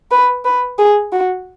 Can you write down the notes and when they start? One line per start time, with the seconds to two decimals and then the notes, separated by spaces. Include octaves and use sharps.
0.11 B4
0.45 B4
0.78 G#4
1.12 F#4